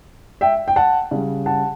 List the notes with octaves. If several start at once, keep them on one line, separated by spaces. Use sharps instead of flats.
E5 G5
G5
F#5 A5
C#3 G3
F#5 A5